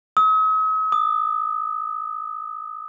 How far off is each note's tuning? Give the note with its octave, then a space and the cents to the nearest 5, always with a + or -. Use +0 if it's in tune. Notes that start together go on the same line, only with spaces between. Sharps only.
D#6 +45
D#6 -30